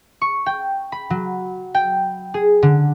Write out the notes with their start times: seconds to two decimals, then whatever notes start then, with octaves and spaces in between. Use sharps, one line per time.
0.21 C#6
0.46 G5
0.92 B5
1.10 F#3
1.75 G5
2.34 G#4
2.63 D3